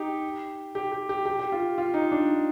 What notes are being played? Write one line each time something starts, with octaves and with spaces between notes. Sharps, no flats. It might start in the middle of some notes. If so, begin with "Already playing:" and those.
Already playing: D#4 G4
G4
G4
G4
G4
G4
F4
F4
D#4
D4